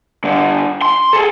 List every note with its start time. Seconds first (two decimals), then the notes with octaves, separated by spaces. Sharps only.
0.24 G2 D3
0.82 C6
1.13 G#4 A4